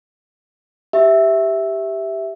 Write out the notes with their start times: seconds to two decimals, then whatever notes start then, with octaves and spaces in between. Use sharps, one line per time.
0.93 G4 E5